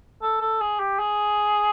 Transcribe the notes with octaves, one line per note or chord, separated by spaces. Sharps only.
A4
A4
G#4
G4
G#4